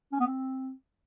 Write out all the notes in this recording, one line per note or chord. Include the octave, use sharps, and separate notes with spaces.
C#4
B3
C4